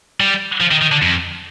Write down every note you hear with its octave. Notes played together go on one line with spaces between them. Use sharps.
G3
F3
D#3
D#3
D3
F2